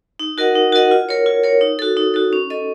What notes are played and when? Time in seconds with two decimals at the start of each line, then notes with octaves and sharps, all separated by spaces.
0.19 D#4
0.38 F#4 A#4 D#5 F#5
0.55 D#4
0.72 F#4 A#4 D#5 F#5
0.91 F4
1.09 A#4 C#5
1.26 F4
1.43 A#4 C#5
1.61 D#4
1.79 F#4 A4
1.97 D#4
2.14 F#4 A4
2.33 C#4
2.50 A4 D#5